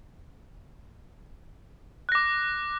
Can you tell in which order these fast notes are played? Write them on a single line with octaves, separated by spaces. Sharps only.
F#6 A#6 D6